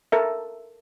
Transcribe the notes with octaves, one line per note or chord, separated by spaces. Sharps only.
A4 A#4 E5